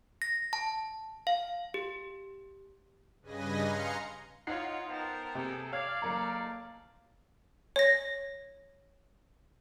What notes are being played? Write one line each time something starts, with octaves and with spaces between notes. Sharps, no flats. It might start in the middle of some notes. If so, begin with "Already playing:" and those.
A#6
A5
F5
G4
G2 C#3 B4 D#5 G#5 A#6
F5 A#5 C6 C#7
D#4 F4 C#5 F#5 C7
B3 A#4 C5 G5 A5
C3 G#4 A4 G5
C#5 D5 F5 F6 G#6
F#1 A#3 A4 F5 A#5
C#5 A#6